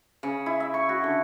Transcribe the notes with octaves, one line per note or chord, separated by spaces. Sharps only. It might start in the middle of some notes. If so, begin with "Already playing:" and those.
C#3
E4
E5
C#6
F#4
D3